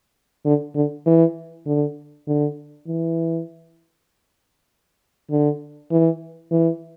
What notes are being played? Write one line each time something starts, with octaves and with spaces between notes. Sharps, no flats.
D3
D3
E3
D3
D3
E3
D3
E3
E3